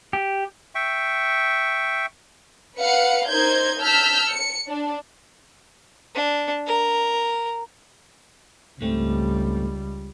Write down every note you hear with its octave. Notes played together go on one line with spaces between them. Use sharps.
G4
E5 G5 C#6
B4 F5 F#5 C#7
D#4 A#4 C5 G6 G#6
A5 E6 F6 G6 B6
C#7
D4
D4
A#4
C#2 G#2 G3 A3 C4